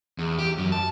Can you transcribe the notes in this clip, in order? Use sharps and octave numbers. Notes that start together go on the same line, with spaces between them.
E2
G4
F#2
A5